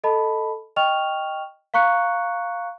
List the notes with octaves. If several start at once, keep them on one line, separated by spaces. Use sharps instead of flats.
A4 D#5 A5 B5
D#5 G5 C#6 F6 F7
F5 A#5 C#6 F#6 C#7